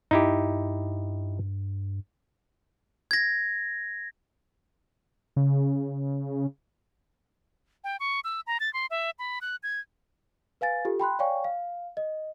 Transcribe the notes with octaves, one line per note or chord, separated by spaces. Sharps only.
G2 D#4 E4 G4
G#6 A#6
C#3
G5
C#6
E6
A#5
A6
C6
E5
B5
F#6
G#6
B4 F5 G#5 A6
F4 G4 A4
G5 B5 C6 F#6
C#5 D5 F5 G5 G#5 C#6
F5
D#5